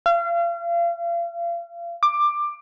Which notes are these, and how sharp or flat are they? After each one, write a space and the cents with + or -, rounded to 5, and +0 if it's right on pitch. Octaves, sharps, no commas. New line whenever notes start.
F5 -35
D6 +15